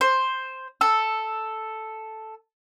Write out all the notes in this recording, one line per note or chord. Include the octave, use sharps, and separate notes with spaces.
C5
A4 E6